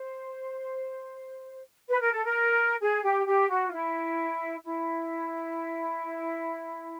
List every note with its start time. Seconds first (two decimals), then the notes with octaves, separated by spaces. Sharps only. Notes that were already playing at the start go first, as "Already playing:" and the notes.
Already playing: C5
1.88 B4
2.00 A#4
2.11 A4
2.23 A#4
2.81 G#4
3.03 G4
3.26 G4
3.50 F#4
3.68 F4
3.72 E4
4.65 E4